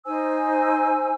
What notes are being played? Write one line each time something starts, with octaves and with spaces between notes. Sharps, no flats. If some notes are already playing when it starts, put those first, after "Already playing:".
D#4 C5 G#5 E6